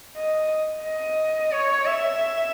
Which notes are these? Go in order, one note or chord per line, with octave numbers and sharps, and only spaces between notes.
D#5
D#5
C#5
E5